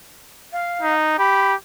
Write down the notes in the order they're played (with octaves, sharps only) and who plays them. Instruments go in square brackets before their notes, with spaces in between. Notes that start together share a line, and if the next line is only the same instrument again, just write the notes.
[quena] F5
[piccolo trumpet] D#4
[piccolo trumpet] G4 [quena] B5